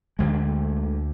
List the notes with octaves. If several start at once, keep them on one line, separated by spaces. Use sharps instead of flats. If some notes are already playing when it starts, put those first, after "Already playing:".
D2 D3 G#3